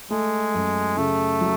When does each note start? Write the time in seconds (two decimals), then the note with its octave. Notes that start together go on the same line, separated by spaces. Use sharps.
0.11 G#3 A3
0.54 F#2
0.97 C#3 A3
1.41 F#3